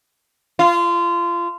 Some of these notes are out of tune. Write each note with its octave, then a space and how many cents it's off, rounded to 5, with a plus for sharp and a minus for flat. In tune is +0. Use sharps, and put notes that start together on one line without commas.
F4 -25